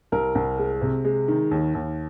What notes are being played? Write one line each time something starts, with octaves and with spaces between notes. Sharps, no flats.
C2 A#4
C2
G#3
C3
G#3
D#3
D#2
D#2